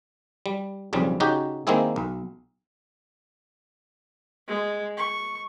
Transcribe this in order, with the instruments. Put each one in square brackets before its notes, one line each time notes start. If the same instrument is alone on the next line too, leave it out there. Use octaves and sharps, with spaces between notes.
[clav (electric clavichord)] G3
B1 F2 C#3 G3
C#3 D#4 F#4 G4
D#3 G#3 A#3 C4 E4 G#4
B1
[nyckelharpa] G#3
C#6